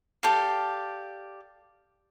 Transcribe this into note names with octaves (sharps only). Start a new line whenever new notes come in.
G4 A4 D5 F5